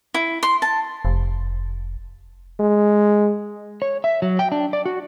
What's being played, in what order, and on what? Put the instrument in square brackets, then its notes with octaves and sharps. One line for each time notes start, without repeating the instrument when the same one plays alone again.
[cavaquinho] E4
C6
A5
[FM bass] F1
[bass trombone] G#3
[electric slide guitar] C#5
E5
F#3
G5
D4
D5
F#4